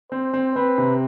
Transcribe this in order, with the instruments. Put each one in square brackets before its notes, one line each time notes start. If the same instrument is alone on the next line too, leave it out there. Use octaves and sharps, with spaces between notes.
[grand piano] C4 [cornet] C5
[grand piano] C4
[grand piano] C4 [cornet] B4
[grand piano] C3